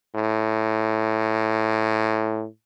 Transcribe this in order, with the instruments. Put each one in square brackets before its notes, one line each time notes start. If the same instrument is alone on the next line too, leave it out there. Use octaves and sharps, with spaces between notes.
[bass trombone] A2